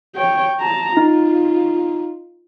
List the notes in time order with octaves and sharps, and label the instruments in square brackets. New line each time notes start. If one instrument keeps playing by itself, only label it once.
[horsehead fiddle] C#5 G5
A5 A#5
[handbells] D#4 [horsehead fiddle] F4